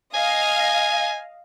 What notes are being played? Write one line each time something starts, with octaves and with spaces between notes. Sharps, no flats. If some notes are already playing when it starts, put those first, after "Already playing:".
D#5 F5 G#5